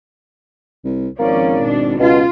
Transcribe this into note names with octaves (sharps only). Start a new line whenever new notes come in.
C2
G#1 F3 A#3 C#4 D5
B2 D4
C#2 B2 F4